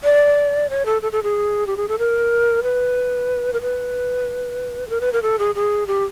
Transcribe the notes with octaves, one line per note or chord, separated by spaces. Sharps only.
D5
C#5
A4
A4
A4
G#4
G4
G#4
A4
A#4
B4
A#4
B4
A4
A#4
B4
A#4
A4
G#4
G#4
G4